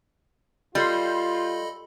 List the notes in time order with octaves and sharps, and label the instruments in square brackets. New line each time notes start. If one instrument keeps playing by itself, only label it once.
[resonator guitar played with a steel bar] G3 [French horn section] F4 [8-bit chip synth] A4 D#5 B5 [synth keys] C6 G6